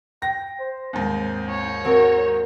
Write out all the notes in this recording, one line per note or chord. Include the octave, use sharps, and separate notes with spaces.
G5 A#6
C5
D#2 G#2 C4
C#5
C4 F#4 A#4